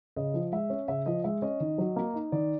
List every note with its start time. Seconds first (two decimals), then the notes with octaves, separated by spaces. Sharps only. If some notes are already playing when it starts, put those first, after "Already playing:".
0.16 C#3 D#5
0.34 F3
0.52 G#3 E5
0.70 C#4
0.88 C#3 E5
1.06 F3 D#5
1.24 G#3 E5
1.42 C#4 D#5
1.60 D#3
1.78 F#3
1.96 A#3
2.14 D#4
2.32 D#3 D5